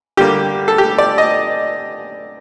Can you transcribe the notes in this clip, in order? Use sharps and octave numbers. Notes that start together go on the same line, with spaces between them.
D3 G3 A#3 G4
A4
G4
D5
D#5